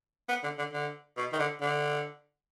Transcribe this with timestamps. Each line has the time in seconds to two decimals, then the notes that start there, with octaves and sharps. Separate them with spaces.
0.29 B3
0.43 D3
0.58 D3
0.73 D3
1.17 B2
1.33 D#3
1.39 D3
1.61 D3